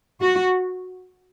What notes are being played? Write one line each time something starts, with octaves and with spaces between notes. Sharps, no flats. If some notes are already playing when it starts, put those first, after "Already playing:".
F#4